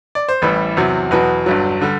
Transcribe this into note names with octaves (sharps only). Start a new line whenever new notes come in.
D5
C5
A1 A2 E3 G3 B4
E2 C3 F#3
E2 B2 F#3 B4
G1 G2 F#3
D3 G3